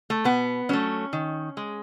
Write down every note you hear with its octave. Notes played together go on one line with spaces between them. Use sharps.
A3
B2 B3
F#3 A3 C#4
D#3
G#3